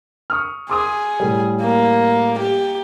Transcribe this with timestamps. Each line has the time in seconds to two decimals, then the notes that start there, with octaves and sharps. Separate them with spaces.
0.30 C#6 D#6 F6
0.70 G#4 C6 D6 D#6
1.20 A2 G3
1.61 A#3
2.39 G4